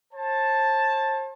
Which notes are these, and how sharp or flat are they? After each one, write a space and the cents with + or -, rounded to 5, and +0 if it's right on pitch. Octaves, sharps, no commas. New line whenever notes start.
C5 +40 A5 +0